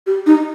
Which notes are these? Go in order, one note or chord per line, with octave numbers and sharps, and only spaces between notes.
G4
D#4